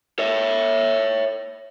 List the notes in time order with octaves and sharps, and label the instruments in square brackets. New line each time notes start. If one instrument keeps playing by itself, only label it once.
[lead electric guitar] C#5 E5